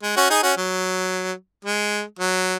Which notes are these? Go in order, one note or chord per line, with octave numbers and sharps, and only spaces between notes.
G#3
C#4 F#4
D#4 G#4
C#4 F#4
F#3
G#3
F#3